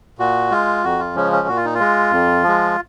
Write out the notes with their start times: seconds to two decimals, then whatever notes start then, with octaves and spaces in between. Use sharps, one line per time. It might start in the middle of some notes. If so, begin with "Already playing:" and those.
0.19 A#2 F#4
0.51 G#3 F4
0.84 F2 F#4
0.99 F4
1.15 C#3 F3 G#3 C#4
1.32 C#4
1.48 A#2 F#4
1.57 F4
1.65 D#4
1.74 F4
1.80 G#3
2.11 F2
2.43 F3 G#3